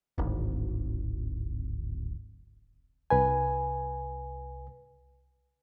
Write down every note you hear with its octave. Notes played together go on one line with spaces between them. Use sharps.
D1 G#1
C2 B4 G#5